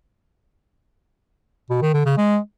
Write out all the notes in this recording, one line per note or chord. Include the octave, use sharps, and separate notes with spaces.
B2
D#3
D3
C#3
G#3